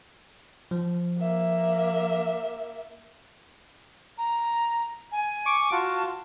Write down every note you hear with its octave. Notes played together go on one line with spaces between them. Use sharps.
F3
A#3 E5
A#5
G#5
C#6 D6
F4 F#4 A5